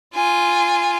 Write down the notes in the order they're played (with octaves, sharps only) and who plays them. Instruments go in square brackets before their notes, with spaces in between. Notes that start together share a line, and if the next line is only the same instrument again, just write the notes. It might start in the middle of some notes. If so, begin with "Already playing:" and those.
[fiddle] F4 G#5